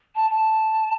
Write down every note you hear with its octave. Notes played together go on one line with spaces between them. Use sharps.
A5
A5